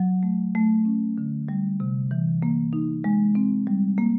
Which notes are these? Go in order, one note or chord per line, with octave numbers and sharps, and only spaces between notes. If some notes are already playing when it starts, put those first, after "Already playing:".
Already playing: F#3
A3
A3
C#4
D3
G3
C3
E3
A#3
D#4
G#3
C4
G3
A#3